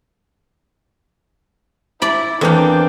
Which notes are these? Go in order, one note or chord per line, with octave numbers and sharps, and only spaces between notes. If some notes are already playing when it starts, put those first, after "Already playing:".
E4 D5 B5
E2 A#3 C4 D4 A4 B4 G6